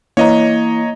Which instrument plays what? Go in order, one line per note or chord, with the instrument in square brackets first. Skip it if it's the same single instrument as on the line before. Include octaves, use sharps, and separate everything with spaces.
[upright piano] E3 [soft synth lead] A#3 [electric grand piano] C#5 D#5 A#5